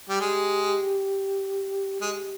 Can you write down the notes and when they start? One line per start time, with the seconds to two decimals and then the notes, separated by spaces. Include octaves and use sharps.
0.09 G3
0.20 G#3 G4
2.01 G#3 G4